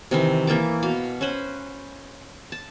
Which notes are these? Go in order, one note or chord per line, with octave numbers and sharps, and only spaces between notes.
C3 D#3 E3
E3 A#3 A5 D6
B2 F5
C#4 B4 C5 B5
A5